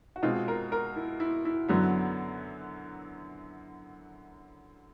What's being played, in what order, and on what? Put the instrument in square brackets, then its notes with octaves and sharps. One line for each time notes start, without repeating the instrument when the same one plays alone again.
[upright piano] F#4
B2 G#3 C4 F4
A#4
A#4
E4
E4
E4
F#2 D3 F#3 B3